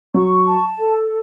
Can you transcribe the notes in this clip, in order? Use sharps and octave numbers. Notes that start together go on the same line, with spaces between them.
F#3 C#6
A5
A4